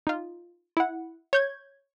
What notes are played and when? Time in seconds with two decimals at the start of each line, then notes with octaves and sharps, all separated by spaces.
0.07 D#4 F4
0.77 E4 F#5
1.33 C#5 G6 G#6